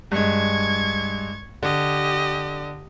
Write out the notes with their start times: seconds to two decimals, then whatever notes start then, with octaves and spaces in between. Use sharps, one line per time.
0.12 G2 G#3 C#6 G#6
1.63 D3 G4 D#5